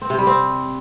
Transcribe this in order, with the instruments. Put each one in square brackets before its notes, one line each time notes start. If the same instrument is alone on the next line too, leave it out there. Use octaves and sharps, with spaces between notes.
[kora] C4
C3
G3
C4